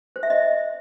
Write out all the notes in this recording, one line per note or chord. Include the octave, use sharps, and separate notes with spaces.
C5
E5
D#5